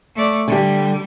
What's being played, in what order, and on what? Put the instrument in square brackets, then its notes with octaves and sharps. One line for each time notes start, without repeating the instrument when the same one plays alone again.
[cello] A3 D5
[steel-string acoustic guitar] D3 G4 [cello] G3